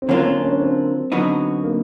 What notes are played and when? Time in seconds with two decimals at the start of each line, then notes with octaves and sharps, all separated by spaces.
0.02 C4
0.09 D3 F#3 A#3 C#4 D4 F4
0.20 C4
0.26 C#4
0.43 C#4
0.60 C4
1.12 D3 F#3 B3 D#4 F#4
1.64 A#3